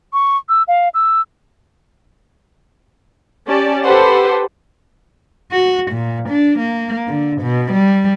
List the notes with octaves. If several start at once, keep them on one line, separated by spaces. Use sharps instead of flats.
C#6
E6
F5
E6
C#4 G4 D5 A5
G4 A4 B4 C5 F#5
F#4
A#2
D4
A#3
D3
B2
G3